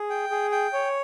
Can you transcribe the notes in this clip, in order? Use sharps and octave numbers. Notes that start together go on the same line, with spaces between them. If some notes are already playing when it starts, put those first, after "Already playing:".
Already playing: G#4
G5
G#4
G5
C#5